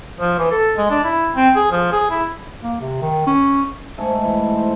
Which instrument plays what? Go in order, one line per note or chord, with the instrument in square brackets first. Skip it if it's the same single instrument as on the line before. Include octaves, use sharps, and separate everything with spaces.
[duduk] F3
E3
A4
G#3
D4
E4
C4
G#4
F3
G#4
E4
[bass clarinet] A#3
C3
D#3
C#4
[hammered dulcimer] G#2 A3 A4 G#5
E3
C5